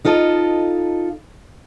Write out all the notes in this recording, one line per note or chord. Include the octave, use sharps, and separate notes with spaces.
D#4 F4 A4 D#5